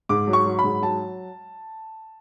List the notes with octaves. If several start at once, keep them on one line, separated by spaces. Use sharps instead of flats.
G#2 D6
F#3
C#6
F#3
B5
G#2
F#3 A5